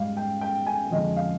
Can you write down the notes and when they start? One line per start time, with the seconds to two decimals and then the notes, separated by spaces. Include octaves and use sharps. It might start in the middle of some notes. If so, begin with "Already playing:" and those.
Already playing: G#2 G3 F5
0.17 G5
0.41 G5
0.67 G#5
0.91 F2 D3 G#3 D#5
1.16 F5